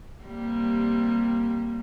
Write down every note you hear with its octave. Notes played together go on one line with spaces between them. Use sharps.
C3 G3 A#3